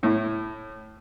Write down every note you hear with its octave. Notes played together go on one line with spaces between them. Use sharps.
A2 E4